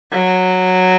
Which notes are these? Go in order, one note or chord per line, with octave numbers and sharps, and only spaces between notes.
F#3